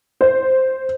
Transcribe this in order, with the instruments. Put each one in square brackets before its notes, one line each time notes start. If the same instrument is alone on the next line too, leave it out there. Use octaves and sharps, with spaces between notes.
[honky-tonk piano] C5